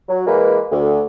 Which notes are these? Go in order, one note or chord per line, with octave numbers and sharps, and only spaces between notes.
F#3
E3 G#3 A#3 A#4 B4
D2